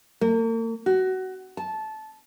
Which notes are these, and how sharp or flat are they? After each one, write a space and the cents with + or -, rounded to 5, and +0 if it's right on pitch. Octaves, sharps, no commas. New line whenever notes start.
A#3 -40
F#4 +20
A5 -15